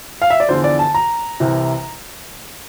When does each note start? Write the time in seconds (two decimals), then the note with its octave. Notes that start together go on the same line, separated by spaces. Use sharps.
0.22 F5
0.30 E5
0.40 D5
0.49 E2 D3 F3 C5
0.64 D5
0.79 A5
0.94 A#5
1.40 C2 C3 E3